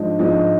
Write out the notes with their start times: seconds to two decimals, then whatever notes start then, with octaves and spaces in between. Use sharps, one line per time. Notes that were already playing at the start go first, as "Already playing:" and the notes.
Already playing: G#2 F3 G#3 D4
0.19 G#2 F3 G#3 D4